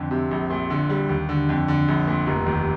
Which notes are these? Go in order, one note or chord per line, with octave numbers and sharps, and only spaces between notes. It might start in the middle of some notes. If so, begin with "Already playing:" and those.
Already playing: F2 D3
C3
A#1
A#2
D3
G3
D#2
D3
F2
D3
A#1
A#2
F1
D#2